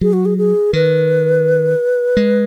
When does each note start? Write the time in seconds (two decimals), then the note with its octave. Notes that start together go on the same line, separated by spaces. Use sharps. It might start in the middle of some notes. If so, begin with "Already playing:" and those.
0.01 F#3 G#4
0.13 F#4
0.25 G#4
0.38 G#4
0.73 D#3 B4
2.17 G#3